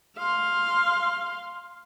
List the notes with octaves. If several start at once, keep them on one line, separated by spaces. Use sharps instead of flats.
F5 C6